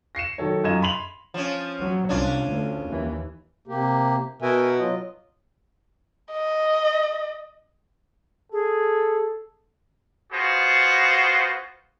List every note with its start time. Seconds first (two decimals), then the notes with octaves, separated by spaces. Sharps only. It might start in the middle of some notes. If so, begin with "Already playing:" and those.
0.15 A#6 C7 C#7 E7
0.38 D#3 F#3 A4 C#5
0.64 F#2 F4 D#5 G#6 E7
0.82 B5 C6 F7 F#7
1.34 F3 C#4
1.78 F#3
2.09 C2 C#4 D4 F4
2.47 D2
2.87 D#2 E3
3.68 C3 A#3 G4
4.42 B2 A#4 E5 G#5
4.79 F#3 F4 D#5
6.33 D#5
8.52 G#4 A4
10.33 B3 F4 F#4 G#4 C5